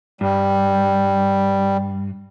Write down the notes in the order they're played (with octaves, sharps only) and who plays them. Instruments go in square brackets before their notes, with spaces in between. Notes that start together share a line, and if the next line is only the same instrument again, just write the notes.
[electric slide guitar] G2 [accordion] G3